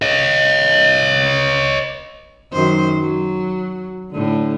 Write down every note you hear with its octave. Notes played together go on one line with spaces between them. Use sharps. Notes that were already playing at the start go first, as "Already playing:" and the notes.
C#5 D#5
F#2 D#3 C5
F#3
A2 D3